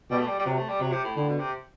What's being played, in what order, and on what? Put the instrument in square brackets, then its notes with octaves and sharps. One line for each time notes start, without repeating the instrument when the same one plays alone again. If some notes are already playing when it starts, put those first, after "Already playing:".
[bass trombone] B2 [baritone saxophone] G3
[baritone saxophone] A3
G3
G3
[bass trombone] C3 [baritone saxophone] F#3
[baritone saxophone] A3
G3
[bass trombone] C3 [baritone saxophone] F#3
[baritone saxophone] C3
A2
[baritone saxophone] A2 [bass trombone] D3
[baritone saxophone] B2
C3